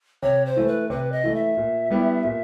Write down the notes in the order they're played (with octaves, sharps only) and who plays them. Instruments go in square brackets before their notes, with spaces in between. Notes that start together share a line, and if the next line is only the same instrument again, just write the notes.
[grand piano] C3 [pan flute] C#5
[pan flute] C5
[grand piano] E3 A3
[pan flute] B4
[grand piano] C3 [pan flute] B4
[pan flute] D#5
[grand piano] E3 A3
[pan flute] E5
[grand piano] A#2
G3 B3 E4 G4
A#2